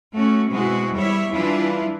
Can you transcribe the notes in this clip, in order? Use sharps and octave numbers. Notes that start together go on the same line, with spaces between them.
A3 C#4 F#4
B2 G#3 C4 E4 F#4 G#4
E2 G3 E4 C#5 E5
E3 G3 D4 E4 F4